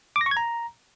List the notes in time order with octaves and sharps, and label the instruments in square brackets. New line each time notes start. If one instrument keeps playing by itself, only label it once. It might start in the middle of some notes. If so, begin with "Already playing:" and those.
[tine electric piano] D6
A#6
C#6
G#6
A#5